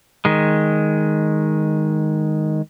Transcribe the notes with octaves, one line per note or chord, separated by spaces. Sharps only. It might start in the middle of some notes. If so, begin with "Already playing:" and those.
D#3 G#3